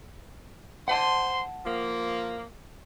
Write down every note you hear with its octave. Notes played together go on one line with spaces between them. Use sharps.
C5 F#5 A5 C6
F3 A#3